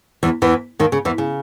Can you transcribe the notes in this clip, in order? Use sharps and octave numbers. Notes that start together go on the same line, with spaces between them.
E2 E3
E2 E3
D#2 D#3
C#3
E2 E3
C#3